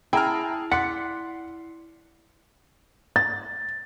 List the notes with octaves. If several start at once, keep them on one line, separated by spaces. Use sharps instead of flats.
E4 G#4 G5 A5 A#5 F6
D5 F#5 C6 B6 C#7
A6